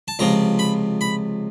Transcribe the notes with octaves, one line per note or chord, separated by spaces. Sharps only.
A5
C#2 C3 F3 A#5
B5
B5